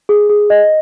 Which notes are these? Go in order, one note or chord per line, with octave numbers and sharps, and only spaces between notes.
G#4
G#4
D#5